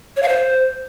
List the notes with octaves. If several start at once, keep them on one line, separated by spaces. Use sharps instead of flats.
C#5
F5
C5